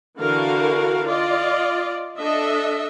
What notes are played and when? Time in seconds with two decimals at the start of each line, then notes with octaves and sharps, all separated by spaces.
0.19 D3 E3 F#4 A#4 F5
1.10 F4 D5 D#5
2.18 D4 A4 D#5 E5